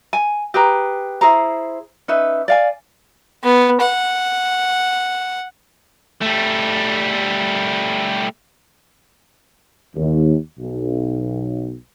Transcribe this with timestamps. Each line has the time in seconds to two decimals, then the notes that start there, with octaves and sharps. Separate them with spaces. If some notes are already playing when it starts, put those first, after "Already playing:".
0.13 G#5
0.54 G4 G#4 B4 A#5
1.21 E4 G#4 C5 A#5
2.08 C#4 D#4 B4 E5
2.48 D5 F5 G#5
3.43 B3
3.81 F#5
6.22 G3 A3
9.96 D#2
10.58 B1